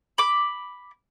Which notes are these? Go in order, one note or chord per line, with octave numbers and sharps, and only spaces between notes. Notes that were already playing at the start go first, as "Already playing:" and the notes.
B5 D6